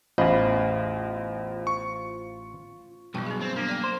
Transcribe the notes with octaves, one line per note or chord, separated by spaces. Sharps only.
A1 E2 F4 C5 D#5 F5 B5
C#6
B1 G2 B2 E3 F#3 G5
B3 G#4
B3 C4
F#3 A#3 D4
D5 G5
C5